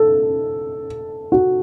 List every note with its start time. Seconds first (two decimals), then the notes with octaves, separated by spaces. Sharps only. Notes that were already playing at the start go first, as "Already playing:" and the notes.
Already playing: A4
1.32 F#4